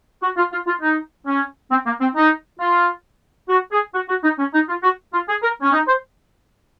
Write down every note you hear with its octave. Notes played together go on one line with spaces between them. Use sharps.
F#4
F4
F4
F4
D#4
C#4
C4
A#3
C4
D#4
F4
F#4
G#4
F#4
F#4
D#4
C#4
D#4
F4
F#4
F4
G#4
A#4
C#4
D#4
C5